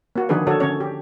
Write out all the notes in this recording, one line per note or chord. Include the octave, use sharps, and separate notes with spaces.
A#3 F#4
D3 D#3 F3 D4 G#4 B4
D3 F#4 A4 C#5
D3 C#4 C#5
G4